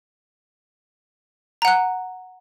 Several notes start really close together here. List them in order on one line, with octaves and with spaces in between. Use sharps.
A#5 F#5 F#6